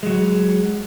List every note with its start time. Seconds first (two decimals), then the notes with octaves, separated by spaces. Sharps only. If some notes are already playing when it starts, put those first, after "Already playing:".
0.03 F#3 G#3